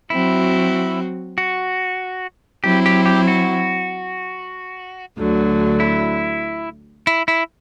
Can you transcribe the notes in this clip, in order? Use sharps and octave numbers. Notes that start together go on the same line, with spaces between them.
F#3 C4 E4 F#4
F#4
F#3 C4 E4 G4
G4
G4
F#4
D2 D3 F#3
E4
E4
E4